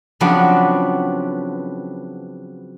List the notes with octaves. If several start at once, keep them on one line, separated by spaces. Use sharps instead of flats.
C#3 F3 F#3 B3 C4 D4